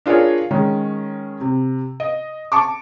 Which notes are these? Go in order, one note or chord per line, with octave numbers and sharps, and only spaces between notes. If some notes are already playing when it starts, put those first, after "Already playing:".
D4 F4 G#4 A#4 C#5
D#3 G#3 C#4
C3
D#5
A5 C#6 D6